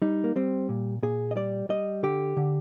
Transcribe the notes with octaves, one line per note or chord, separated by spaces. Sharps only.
G3 D#4
A#3
G3 C4
A#2
A#2 G#4
D#5
G3 D5
G3 D#5
D3 G4
D3